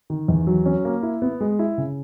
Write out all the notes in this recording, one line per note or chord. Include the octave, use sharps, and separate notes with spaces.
D#3
E2
F#3
C#4
A#3
E4
B3
G#3
E4
C#3